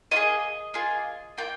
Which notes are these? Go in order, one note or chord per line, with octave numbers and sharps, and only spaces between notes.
A#3 F4 G#4 D#5
A#3 F4 G#4
A#3 F4 G5